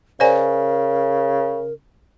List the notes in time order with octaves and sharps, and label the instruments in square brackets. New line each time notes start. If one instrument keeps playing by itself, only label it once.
[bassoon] C#3 [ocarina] A#4 [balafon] C5 D5 G#5